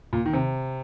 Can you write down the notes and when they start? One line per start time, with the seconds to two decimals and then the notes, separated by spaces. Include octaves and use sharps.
0.13 A#2
0.26 D#3
0.33 C3